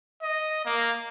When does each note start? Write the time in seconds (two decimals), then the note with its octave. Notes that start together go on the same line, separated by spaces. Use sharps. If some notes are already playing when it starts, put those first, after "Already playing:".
0.22 D#5
0.66 A#3